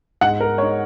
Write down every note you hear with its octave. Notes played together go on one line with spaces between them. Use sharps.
G#2 F#5
A#4
G#3 D#4 C#5